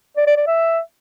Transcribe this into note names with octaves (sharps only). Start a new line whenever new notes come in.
D5
D5
D5
E5